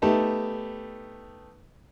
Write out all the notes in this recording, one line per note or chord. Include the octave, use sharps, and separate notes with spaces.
A3 B3 D#4 G4 A5